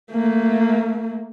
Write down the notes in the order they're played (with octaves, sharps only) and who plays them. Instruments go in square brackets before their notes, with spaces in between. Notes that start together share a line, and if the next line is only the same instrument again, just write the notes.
[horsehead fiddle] A3 A#3